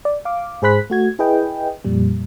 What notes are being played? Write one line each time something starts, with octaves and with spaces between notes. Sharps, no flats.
D5
F5 D6
G#2 G#4 C5 B5 F#6 B6
A3 F#4 G#6
E4 G#4 B4 D#5 G5
F2 A#2 G3